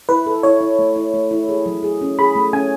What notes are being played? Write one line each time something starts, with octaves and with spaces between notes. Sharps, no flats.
E4 B4
A4
E4 C#5
E4
A3
E4
A3
E4
G#4
F#3
G#4
C#4
G#4 B5
A3
C#4 G#5